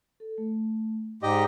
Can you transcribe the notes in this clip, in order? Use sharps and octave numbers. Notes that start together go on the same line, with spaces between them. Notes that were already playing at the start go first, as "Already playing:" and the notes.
A4
A3
G#2 G4 D5 D#5